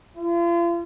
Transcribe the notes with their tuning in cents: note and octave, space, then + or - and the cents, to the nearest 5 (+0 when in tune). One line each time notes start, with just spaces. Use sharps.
F4 -40